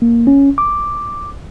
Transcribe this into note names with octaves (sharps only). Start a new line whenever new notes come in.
A#3
C#4
D6